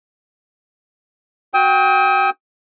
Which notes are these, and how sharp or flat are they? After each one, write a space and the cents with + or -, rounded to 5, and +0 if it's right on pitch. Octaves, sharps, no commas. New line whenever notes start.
F#4 +0 G5 +15 D#6 +45